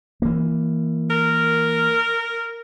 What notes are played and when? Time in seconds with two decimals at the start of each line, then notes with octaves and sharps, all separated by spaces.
0.22 E3 A#3
1.10 A#4